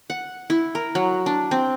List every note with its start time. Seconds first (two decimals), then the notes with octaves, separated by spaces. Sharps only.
0.10 F#5
0.50 E4
0.75 A#4
0.95 F#3
1.26 D4
1.51 C4